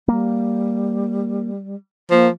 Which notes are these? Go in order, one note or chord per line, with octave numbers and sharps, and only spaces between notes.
G3 A#3
F3 A#3